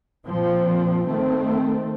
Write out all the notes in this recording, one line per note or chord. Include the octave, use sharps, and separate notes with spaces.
A#2 F3 C4
D#3 A3 C4